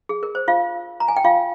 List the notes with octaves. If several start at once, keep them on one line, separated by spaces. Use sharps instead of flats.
G#4
A#4
C5
F4 F5
A#5
G#5
G5
F4 F5